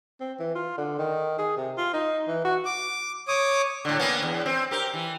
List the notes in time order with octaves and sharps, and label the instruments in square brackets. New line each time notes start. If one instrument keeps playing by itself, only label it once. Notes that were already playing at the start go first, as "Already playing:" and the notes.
[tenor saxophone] C4
E3
F4
D3
D#3
G#4
C3
F4
D#4
E3
F#4
[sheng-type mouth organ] D6
C#5 D6 D#6
[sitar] A2 D3
A#3 B3 C#4
E2
C4
G4 A#4
E3